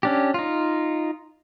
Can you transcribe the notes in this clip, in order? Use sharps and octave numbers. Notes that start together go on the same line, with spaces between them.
C#4 D4 G4
D#4 F4